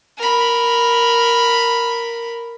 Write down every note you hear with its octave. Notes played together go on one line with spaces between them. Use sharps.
A#4 B5